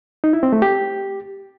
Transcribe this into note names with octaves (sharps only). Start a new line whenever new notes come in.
D#4
E4
C4
A3
G4